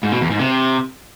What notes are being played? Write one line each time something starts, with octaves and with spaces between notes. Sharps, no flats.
G#2
B2
E2
G#2
C3